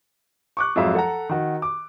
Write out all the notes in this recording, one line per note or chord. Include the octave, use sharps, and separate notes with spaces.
C#6 D6 F#6
F2 G#2 F#3 E5 F5
A4 F#5 A#5
D#3 F#4
D6